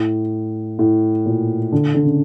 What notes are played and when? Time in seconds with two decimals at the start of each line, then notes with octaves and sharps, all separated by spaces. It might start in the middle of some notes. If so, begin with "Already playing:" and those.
Already playing: A2
0.79 A2
1.26 A#2
1.72 D3
1.94 D3
2.04 C#3